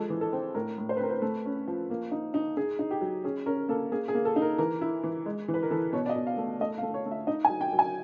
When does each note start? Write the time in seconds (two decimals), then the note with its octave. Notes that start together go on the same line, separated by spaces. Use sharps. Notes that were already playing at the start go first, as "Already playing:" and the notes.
Already playing: F3 G#3 A4
0.10 E3
0.21 A4
0.33 C4
0.55 A2 A#4
0.78 A2
0.89 C5
0.97 B4
1.00 C4 A#4
1.10 B4
1.22 A3
1.46 C#4
1.68 F3
1.90 A#3
2.12 D#4
2.34 D#4
2.57 D#4 G#4
2.79 D#4
2.91 G4
3.01 F#3
3.24 C#4 G#4
3.46 C#4 A#4
3.69 A#3 A4
3.92 A#3 G#4
4.08 G#4
4.14 A#3
4.25 A4
4.36 D#4
4.42 A#4
4.58 E3 A#4
4.81 E4
5.03 E3
5.26 G#3
5.48 E3
5.54 B4
5.63 A#4
5.71 E3 A4
5.93 B2 C#5
6.06 D5
6.09 D#5
6.16 B2
6.27 F5
6.37 A3
6.60 A3 D#5
6.78 F5
6.83 A3
6.94 C#5
7.06 A3
7.11 E5
7.27 D#4 D#5
7.45 G#5
7.50 F#3
7.61 G5
7.73 F#3
7.79 G#5